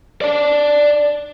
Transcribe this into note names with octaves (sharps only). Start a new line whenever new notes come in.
D5 A5